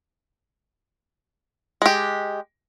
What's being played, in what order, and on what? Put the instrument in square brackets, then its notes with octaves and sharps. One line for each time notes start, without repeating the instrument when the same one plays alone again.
[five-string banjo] G#3 G4